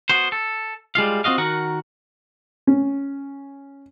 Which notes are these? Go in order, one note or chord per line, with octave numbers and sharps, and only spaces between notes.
B3 F#4 C5
A4
G3 G#3 F4 F5
C4 F4 F#4 D#5 F5
D#3 F#4 A#4 F#5
C#4